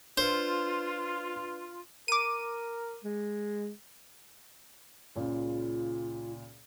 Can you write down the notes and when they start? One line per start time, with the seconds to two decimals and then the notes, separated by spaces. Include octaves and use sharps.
0.18 D4 F4 B4 C5
2.08 A#4 D6 D#7
3.04 G#3
5.16 C#2 A#2 C#3 F4